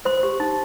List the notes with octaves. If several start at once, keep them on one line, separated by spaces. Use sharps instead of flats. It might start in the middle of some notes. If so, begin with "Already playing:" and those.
C5 C6
G4
D#4